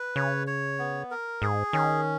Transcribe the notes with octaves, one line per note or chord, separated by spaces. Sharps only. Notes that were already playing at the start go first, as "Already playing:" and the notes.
Already playing: B4
C#3 C#5
C#5
B3
A#4
G#2 G#4
D#3 C#4